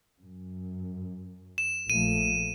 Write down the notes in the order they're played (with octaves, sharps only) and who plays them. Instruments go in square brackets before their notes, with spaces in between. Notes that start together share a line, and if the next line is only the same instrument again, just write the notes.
[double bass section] F#2
[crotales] E7
[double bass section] A#1 F3 A3 [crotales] D#7